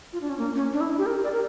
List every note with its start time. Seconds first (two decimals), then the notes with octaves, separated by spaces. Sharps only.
0.13 F4
0.21 D4
0.29 C#4
0.38 A#3
0.55 C#4
0.72 D4
0.80 E4
0.98 G4
1.06 A#4
1.24 D5
1.33 A#4